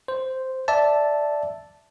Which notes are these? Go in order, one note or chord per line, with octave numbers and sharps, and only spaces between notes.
C5
D5 E5 A5